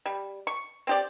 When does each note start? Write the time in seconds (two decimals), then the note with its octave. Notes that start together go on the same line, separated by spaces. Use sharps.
0.06 G3
0.47 C#6
0.87 C4 G4 D5